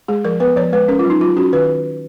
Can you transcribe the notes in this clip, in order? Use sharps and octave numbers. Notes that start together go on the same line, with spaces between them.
G#3 G#4
F3 A#4
B3 B4
F3 C#5
G#3 B4
C#4 A#4
F4
F#3
D#4
F#3 F4
C#4 F#4
D#3 B4